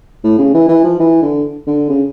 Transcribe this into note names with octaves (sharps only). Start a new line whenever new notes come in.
A2
C#3
E3
E3
F3
E3
D3
D3
C#3